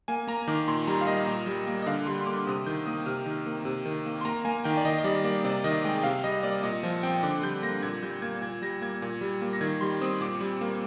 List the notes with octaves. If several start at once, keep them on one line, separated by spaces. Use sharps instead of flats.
A#3 G#5
A#3 A#5
D#3 D6
A#2 C6
G3 A#5
F5
A#3 D#5
A#2
G3
A#3
D#5
D3 F5
G3 C6
C6
A#3 D6
C3 D#6
D#3 G6
A#3 D#6
C3 F6
D#3
A#3
C3
D#3
A#3
C6
A#3 A#5
A#3 G#5
D#3 G5
D5
D#3 D#5
D#5
G3 D5
A#3 D5
C3 D5
D#3 D#5
G#3 G5
C3 F5
G3 D#5
A#3 D5
A#2 D#5
F3
C4 G5
D3 D6
G3 G6
A#3 A#6
A#2 G#6
G3 G6
A#3 G#6
A#2 G#6
G3 A#6
A#3 G#6
A#2
G3
A#3
A#6
D#3 G#6
G3 C6
C4 D#6
A#2 D6
G3
A#3